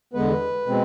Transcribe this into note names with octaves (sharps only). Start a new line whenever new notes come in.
E2 D3 G#3 B3 B4
B2 G#3 C4